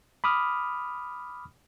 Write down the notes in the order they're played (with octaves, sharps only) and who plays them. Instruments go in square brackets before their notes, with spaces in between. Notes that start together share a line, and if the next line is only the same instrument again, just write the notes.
[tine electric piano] B5 D6 D#6 F6